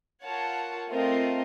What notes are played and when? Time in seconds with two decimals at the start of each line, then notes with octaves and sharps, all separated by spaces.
0.23 F4 A#4 C#5 F#5 A5
0.89 A3 C4 F4 A#4 D#5